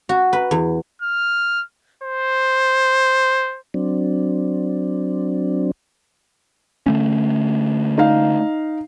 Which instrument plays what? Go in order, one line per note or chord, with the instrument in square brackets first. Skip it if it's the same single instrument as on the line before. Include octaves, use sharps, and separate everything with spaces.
[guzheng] F#4
B4
E2
[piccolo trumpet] F6
C5
[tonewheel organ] F#3 C4 D4
[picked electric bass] D3 A3 C#4
[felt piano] D#4 F5